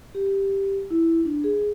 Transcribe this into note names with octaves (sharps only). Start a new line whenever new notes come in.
G4
E4
D4
G#4